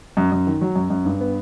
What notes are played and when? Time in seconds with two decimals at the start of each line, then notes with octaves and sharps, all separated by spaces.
0.17 F#2
0.32 F#2
0.47 D#3
0.61 F#3
0.75 F#2
0.90 F#2
1.05 G2
1.20 B3